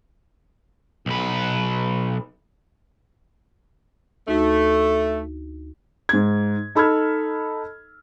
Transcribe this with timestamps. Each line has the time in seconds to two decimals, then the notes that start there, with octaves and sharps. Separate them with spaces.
1.06 B1 B4
4.28 D2 A3 D#4 F#4
6.09 G#2 G#6
6.75 D#4 A4 B5 E6 F6 G#6